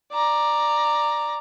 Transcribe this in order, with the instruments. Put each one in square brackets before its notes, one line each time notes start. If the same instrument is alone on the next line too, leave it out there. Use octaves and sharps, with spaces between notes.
[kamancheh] D5 A#5